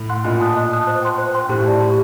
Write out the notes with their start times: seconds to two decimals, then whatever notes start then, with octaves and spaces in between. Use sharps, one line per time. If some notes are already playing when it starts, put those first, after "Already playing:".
Already playing: A2
0.09 F#5 C6 F#6
0.24 A#2 D#5
0.40 A5 D#6 F#6
0.56 D#5
0.72 A5 D#6 F#6
0.87 C5
1.03 G5 C6 F#6
1.18 C5
1.35 G5 C6 F#6
1.49 A2 G4
1.66 D5 A5
1.81 G4